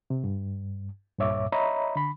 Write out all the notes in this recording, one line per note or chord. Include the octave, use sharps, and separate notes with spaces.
C3
G2
C2 G2 A#2 C#5 E5 D6
C#5 D#5 E5 A#5 B5
D3 B5